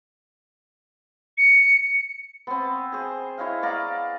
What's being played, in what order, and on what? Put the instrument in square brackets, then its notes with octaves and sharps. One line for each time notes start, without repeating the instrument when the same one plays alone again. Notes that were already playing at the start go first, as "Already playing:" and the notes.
[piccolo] C#7
[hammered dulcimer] B3 C4
G#4 C5
E4 C#5 D#5 F5
B3 D5 F5 A#5